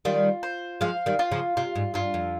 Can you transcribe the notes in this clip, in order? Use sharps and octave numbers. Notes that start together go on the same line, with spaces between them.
D#3 G3 F4
C5
F3 G#3 F5
D#3 G3
F4
C#3 F3
C3 F4
G#2
G2 F4
F2